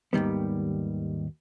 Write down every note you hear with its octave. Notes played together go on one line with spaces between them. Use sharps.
D#2 G#2 D#3 G3 B3